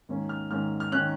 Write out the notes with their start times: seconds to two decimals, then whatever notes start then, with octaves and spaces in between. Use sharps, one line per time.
0.09 G#2 D#3 A#3 C#4
0.29 F6
0.50 G#2 D#3 A#3 C#4 F6
0.80 F6
0.92 D#3 A#3 C#4 F#6